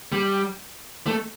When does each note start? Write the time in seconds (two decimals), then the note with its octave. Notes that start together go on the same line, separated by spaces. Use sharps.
0.12 G3
1.07 A3